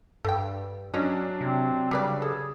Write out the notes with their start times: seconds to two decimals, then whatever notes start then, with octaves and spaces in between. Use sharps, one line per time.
0.25 G2 A4 G5
0.94 F#3 C#4 D4 C#5 D#5
1.41 C3 C4
1.91 C#3 G3 G4 B4 D5
2.22 G#4 A4